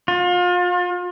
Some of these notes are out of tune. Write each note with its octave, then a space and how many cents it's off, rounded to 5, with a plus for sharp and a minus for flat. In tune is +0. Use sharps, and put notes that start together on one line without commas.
F4 +35